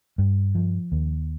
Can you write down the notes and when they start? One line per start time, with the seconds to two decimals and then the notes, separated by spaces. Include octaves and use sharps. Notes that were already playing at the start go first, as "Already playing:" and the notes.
0.18 G2
0.55 F3
0.92 D#2